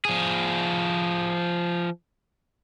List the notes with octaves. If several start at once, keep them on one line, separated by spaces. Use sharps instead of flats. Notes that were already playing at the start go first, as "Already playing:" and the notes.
F3 G#4